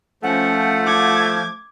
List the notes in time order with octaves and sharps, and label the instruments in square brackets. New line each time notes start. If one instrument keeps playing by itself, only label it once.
[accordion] F3 [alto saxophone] A3 [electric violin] C#4 [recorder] F#5
[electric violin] D6 G#6